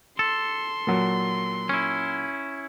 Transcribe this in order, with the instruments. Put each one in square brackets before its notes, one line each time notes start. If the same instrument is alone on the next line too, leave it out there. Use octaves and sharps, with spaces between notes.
[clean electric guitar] A4 [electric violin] C6
[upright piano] A#2 F#3
[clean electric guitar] C#4 E4